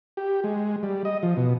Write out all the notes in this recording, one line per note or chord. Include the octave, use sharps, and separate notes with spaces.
G4
G#3
G3
D#5
F3
B2